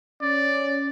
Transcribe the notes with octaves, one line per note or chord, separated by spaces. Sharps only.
C#4 D5